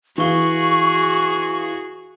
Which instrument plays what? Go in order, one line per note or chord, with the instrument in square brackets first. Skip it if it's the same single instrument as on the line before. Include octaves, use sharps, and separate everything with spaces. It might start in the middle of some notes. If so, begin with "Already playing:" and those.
[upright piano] E3 F5 G7 [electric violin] F#4 G#4 [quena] C#6